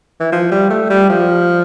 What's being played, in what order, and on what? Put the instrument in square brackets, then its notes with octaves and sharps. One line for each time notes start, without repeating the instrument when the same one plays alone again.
[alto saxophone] E3
F3
G3
A3
G3
F3